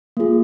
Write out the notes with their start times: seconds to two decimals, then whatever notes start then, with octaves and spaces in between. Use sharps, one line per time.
0.17 A#3 F4 G#4